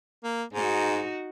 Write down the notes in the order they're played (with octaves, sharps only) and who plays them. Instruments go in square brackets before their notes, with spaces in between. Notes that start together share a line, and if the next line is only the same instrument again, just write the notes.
[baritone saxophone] A#3
[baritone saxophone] G#2 [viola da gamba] D#4 F#4